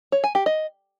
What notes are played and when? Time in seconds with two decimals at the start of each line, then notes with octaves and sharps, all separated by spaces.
0.12 C#5
0.24 G#5
0.35 G4
0.46 D#5